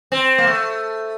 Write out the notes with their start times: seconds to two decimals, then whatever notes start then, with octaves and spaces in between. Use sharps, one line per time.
0.12 C4
0.38 A#3
0.47 A3